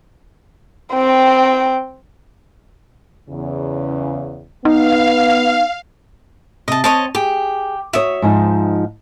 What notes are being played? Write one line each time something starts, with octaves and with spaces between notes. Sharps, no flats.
C4 G5
E2 C#3
B3 D#4 F5
C3 D#5 A5
C4 C#5 D#5 A5
G4 G#4
F#4 C#5 E5 D#6
G#2 F3 D#4